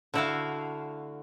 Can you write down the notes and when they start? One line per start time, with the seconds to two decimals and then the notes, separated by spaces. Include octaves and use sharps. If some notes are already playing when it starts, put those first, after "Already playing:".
0.14 D3 A3 E4 F#4 E5 F5